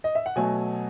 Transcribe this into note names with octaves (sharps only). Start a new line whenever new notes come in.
D#5
E5
F#5
B2 F#3 A3 G#5